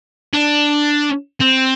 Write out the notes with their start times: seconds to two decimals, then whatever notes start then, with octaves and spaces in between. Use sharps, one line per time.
0.33 D4
1.40 C4